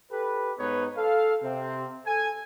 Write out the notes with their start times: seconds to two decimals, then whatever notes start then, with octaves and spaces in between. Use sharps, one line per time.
0.12 G4 A4 B4
0.59 G#2 B3 D#4 B4 C#5
0.97 A4 F5
1.43 C3 C4
2.07 A4 G#5